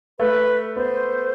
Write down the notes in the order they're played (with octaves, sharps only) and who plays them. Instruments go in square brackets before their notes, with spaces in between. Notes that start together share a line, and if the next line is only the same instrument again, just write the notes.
[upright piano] A3 [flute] B4
[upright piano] B3 [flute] C5